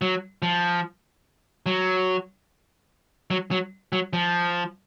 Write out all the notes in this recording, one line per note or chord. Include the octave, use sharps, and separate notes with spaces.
F#3
F3
F#3
F#3
F#3
F#3
F3